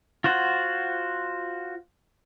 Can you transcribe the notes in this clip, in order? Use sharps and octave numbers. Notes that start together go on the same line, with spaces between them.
F4 F#4 C5 F#5